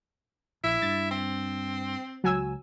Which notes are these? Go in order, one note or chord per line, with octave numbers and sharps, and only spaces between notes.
A#1 E4
G2 A6
C4
C#2 F#3 G#5 E6